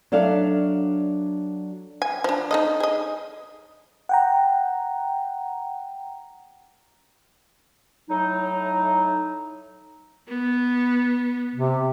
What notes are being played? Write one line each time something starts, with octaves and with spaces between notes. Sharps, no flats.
F#3 D4 A4 E5 F5
G#5
F3 D4
D#4 A4 D#5
G#4 D#5
F#5 G5 A#5
A2 F#3 D#4
B3
C3